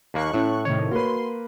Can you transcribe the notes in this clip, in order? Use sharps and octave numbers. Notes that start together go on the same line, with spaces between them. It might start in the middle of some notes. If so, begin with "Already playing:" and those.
D#2 A#3 C#6 F#6
A2 C#4 E4 E6
A2 C3 D#3 C#5
A#3 F#4 B4 C6